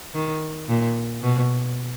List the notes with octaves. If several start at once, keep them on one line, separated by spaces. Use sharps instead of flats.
D#3
A#2
B2